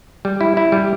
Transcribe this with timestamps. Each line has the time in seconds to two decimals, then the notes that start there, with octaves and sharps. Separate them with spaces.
0.25 G3
0.41 E4
0.57 E4
0.72 G3